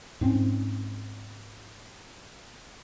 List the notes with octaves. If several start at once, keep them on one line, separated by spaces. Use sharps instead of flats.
G#2 C4 C#4